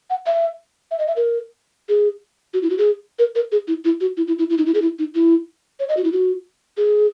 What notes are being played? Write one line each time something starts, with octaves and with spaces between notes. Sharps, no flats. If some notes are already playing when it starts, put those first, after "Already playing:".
F#5
E5
E5
D#5
E5
A#4
G#4
F#4
E4
F#4
G#4
A#4
A#4
G#4
E4
E4
F#4
E4
E4
E4
E4
D#4
E4
G#4
E4
D#4
E4
C#5
D#5
F#4
E4
F#4
G#4